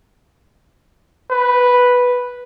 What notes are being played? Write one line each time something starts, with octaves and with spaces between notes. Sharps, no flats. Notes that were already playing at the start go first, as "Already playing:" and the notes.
B4